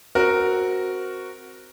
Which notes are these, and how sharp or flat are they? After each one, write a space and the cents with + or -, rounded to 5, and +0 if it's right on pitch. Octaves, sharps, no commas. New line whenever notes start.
C4 +0 F#4 +0 A#4 +0